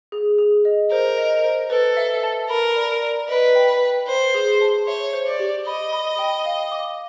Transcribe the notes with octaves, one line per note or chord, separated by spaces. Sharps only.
G#4
G#4
D#5
A#4 C5
D#5
C5
A4 B4
E5
A5
A#4 B5
D5
D5
B4 D#5
G5
G5
B4 C5
G#4
A5
C#5 E5
C5
D5
G4
D#5 B5
B5
G5
F5
D6